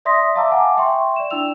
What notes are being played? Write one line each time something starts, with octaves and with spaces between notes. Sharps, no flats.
D5 E5 C6 D#6 A#6 B6
E5 F5 A5 A#5 D6 E6
F#5 G#5 A5 D6
E5 G5 C6 C#6
D5 E7
D4 E4 G5 E6 F7